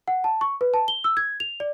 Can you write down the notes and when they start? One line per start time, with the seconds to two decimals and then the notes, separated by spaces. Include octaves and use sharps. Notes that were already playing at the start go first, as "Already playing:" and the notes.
0.08 F#5
0.24 A5
0.41 C#6
0.61 B4
0.74 A5
0.88 G7
1.04 E6
1.17 G#6
1.40 F7
1.60 D5